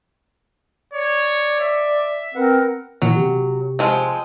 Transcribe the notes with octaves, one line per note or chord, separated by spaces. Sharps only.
C#5 D5
E5
B3 C4 A#4 F#5
A#2 E3 F#3 F#5
C3 G4
F3 G#3 C4